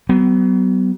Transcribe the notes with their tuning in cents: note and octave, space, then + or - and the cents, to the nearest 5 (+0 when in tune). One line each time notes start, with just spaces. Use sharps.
F#3 +40 B3 +20